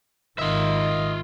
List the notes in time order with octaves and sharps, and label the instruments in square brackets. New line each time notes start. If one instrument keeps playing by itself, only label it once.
[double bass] G#1 D#3 [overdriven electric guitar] F4 E5 [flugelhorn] D#5